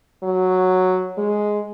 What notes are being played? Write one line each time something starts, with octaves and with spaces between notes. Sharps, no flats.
F#3
G#3